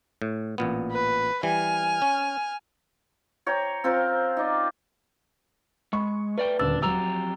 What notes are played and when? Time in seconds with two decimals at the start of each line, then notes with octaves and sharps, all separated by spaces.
0.22 A2
0.58 A1 A#2 B3
0.90 B4
1.43 E3 G3 G#5 F6
2.02 C#4
3.46 C#5 G5 A#5
3.84 C4 F4 A#4 C5
4.37 D#4 D5
5.93 G#3 B5 C#6
6.38 A3 B4 D5 G5
6.59 D#1 D2 D4 E6 A6
6.82 F2 F#3 G4 A#5 E6